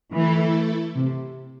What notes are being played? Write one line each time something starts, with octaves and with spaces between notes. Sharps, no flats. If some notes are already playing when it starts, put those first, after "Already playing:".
E3 A3 E4 A4
C3